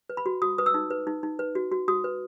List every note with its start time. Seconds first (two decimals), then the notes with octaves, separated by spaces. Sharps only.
0.10 B4
0.17 B5
0.26 F#4
0.42 F#4 D#6
0.58 B4 D#6
0.66 E6
0.74 D#4
0.90 B4
1.07 D#4
1.23 D#4
1.39 B4
1.55 F#4
1.72 F#4
1.88 F#4 D#6
2.04 B4